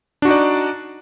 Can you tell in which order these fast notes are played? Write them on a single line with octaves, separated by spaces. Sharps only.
D4 F#4 D#4 D5